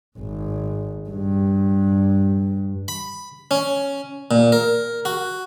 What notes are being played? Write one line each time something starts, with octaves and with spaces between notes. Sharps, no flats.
G#1
G2
B5
C#4
A#2
A#4
F#4